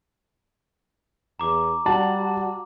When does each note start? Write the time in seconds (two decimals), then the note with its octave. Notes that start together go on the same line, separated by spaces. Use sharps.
1.39 E2 A#5 D6
1.86 G3 F#4 A5